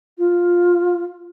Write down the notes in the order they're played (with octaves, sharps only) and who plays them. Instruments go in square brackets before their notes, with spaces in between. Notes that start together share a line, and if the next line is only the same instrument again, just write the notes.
[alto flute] F4